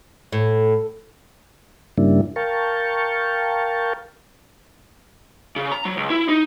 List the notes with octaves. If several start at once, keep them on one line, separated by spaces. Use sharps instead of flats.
A2
G2 C#3 G3 A#3 D4 E4
A#4 F5 G5 A5 C#6
C#3
A#5
F#3
C#2
E4
D#4